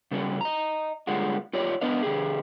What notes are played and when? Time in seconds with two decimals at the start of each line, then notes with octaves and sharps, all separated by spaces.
0.11 C#3 G3 C#4 F#4
0.41 D#5 A#5
1.07 D3 G3 G#3 F4 F#4
1.53 F4 G4 C#5 D5
1.81 B3 D4 B4 D#5 F5
2.02 D2 D3 G4 G#4